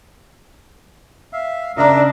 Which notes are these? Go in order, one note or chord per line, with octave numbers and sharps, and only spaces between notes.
E5 F5
C#3 D4 A#4 D#5 E5 A#5